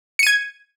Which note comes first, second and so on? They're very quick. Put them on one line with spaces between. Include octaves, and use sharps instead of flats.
C#7 D#7 G#6